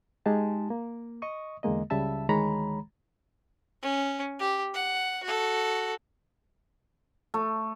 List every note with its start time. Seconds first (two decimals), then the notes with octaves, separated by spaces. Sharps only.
0.26 G#3 D#4 G4 G#4 A5
0.70 A#3
1.22 D#5 C#6 D#6
1.63 E2 D3 G#3 A#3 D#5
1.90 C#2 C#3 G3 E5 A5 E6
2.29 D2 D#3 G#3 C#5 A#5 B5
3.82 C#4
4.39 G4
4.74 F#5
5.23 F#4 A4
7.34 A3